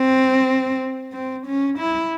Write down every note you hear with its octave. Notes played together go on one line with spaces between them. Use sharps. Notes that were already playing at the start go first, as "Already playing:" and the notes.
Already playing: C4
C4
C#4
E4